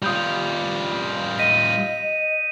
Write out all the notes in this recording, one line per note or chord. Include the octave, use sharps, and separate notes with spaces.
G3 F4 D#6 G6 F7
D#5 A#6 B6 D#7